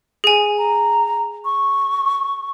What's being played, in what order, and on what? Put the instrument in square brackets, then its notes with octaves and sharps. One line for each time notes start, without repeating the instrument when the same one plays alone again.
[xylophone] G#4 G#5
[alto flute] A#5
C#6